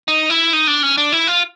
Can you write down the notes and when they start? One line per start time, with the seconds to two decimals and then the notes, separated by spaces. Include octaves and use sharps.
0.08 D#4
0.30 E4
0.53 D#4
0.67 D4
0.83 C#4
0.98 D4
1.12 E4
1.27 F4